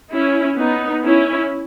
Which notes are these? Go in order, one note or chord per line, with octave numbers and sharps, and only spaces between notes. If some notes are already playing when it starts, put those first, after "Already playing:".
C#4 E4
B3 D#4
C#4 E4